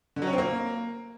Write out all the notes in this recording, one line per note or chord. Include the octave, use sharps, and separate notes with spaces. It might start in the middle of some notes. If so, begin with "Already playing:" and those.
D3
F#3
C#4
C4
A#3